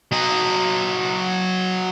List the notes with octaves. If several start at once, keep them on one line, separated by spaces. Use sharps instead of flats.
F#3 D#5